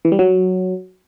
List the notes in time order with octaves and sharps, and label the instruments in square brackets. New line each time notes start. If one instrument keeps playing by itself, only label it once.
[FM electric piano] E3
G3
F#3